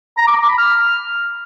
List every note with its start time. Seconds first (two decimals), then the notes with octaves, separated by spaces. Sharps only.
0.17 A#5
0.27 D6
0.38 A#5
0.48 B5
0.58 F6